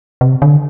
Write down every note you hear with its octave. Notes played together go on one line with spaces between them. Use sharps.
C3
D3